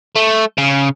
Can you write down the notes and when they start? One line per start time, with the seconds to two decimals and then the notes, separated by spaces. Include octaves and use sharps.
0.16 A3
0.58 C#3